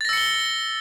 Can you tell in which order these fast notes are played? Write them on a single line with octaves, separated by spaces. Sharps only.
A6 A#6 E6 C#7 G7